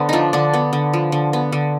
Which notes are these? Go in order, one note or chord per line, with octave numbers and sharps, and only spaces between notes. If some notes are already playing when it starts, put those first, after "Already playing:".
Already playing: D3 B3 C5
F3 D4 D#4
D3 D4
B3
D3
F3
D3
B3
D3